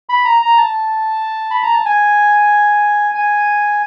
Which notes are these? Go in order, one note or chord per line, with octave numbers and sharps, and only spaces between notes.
B5
A#5
A#5
A5
B5
A#5
A5
G#5
G#5